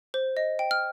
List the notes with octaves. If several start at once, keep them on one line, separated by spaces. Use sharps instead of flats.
C5
D#5
G5
F6